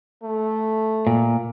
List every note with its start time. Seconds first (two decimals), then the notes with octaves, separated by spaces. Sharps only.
0.23 A3
1.07 A#2